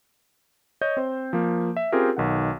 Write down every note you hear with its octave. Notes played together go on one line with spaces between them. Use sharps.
C#5 D#5 G6
C4 C5
F3 A#3
E5
C4 C#4 F4 G4 G#4 A#4
B1 D#3 F#5